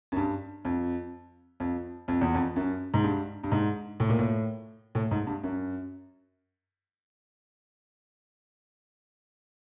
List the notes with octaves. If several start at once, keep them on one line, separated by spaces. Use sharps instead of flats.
F#2
G2
F2
F2
F2
E2
F2
F#2
G#2
G2
G2
G#2
A2
A#2
A2
A2
G#2
G2
F#2